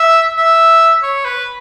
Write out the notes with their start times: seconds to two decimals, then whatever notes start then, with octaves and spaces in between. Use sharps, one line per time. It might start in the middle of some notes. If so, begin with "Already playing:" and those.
Already playing: E5
0.37 E5
1.03 C#5
1.25 B4